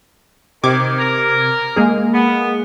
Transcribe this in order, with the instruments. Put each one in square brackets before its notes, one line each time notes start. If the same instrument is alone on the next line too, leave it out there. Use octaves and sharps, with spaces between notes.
[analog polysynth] C3 D6 G#6 [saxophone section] D#3
[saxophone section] A#4
[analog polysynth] G#3 A#3 G#4
[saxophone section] B3